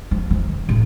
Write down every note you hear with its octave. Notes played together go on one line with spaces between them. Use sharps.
F3
D#3
A2